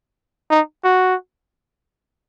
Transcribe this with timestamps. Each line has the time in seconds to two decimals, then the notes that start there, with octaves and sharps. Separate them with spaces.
0.50 D#4
0.84 F#4